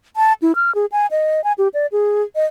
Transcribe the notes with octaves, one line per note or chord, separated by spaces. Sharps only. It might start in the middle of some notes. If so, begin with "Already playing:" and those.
A5
E4
F6
G#4
G#5
D#5
G#5
G4
D5
G#4
D#5